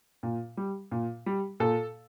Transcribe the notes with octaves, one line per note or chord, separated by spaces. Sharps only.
A#2
G3
A#2
G3
A#2 A4